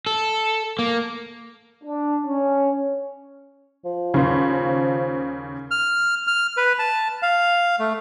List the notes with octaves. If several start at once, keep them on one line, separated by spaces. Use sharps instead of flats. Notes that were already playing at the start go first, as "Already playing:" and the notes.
A4
A#3
D4
C#4
F3
D#2 C#3
F6
F6
B4
A5
F5
A3